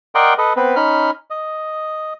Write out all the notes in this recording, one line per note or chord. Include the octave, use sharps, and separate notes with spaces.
A#4 D5 D#5 F#5 G5 C6
A4 B4 D#5
B3 C4 B4
C#4 D#4 B5 F6
D#5